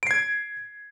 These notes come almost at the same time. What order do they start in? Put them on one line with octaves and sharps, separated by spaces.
D7 C7 G#6